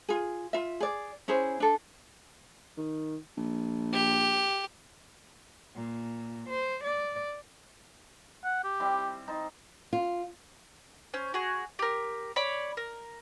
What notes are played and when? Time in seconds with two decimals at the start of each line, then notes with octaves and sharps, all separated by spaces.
0.09 F4 G#4
0.53 F4 E5
0.80 G#4 D5
1.28 C#4 E4 G#4 C5
1.60 D4 A4
2.77 D#3
3.37 A#1
3.93 G4
5.76 A#2
6.49 C5
6.85 D5
8.45 F#5
8.64 G4
8.80 G3 C4 E4
9.28 D#4 C5 A5
9.93 F4
11.14 C#4 C5
11.34 F#4 G#4
11.79 G4 A#4
12.36 C#5 D5 B5
12.77 A#4